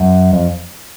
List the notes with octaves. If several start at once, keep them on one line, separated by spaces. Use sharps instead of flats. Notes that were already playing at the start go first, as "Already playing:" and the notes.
Already playing: F#2
F2